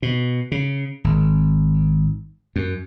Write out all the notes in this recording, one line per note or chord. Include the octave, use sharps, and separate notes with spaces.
B2
C#3
G#1
F#2